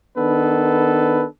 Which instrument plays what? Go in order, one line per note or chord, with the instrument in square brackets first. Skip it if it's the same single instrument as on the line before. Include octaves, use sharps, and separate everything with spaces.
[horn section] D#3 B3 D4 A4 B4